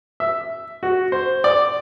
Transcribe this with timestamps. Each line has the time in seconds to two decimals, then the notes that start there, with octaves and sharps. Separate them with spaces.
0.20 E5
0.83 F#4
1.12 C5
1.44 D5